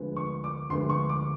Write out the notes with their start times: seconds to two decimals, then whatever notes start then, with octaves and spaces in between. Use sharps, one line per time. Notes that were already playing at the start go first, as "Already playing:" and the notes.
Already playing: D2 D3 F3 G#3 B3
0.16 C#6
0.44 D6
0.70 D2 D3 F3 G#3 B3 C6
0.90 C#6
1.09 D6